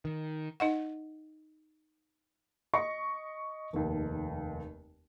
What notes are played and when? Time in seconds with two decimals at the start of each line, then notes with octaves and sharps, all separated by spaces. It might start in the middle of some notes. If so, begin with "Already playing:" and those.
0.05 D#3
0.60 D#4 D#5 F#5
2.74 D#5 C#6 A#6 C#7
3.73 F1 D#2